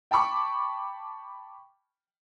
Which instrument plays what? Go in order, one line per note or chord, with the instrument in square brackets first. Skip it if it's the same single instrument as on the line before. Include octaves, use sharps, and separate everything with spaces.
[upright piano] G5 A5 B5 C#6 D6